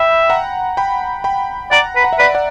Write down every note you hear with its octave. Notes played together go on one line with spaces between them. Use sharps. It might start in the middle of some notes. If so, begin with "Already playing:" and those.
Already playing: E5 G5 B5
F#5 A#5
G5 B5
G5 B5
D5 F#5 A#5
B4
F#5
E5
B4 D5 F#5
D5 F#5